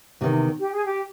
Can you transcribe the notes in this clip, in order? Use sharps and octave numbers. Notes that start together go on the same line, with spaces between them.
E2 C3 D#3
G4
G#4
G4